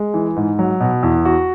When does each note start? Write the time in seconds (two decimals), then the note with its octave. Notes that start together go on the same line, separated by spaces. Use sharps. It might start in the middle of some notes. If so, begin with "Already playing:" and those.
Already playing: G#3
0.14 E3
0.36 G#2
0.59 F#3
0.80 B2
1.03 E2
1.25 F#4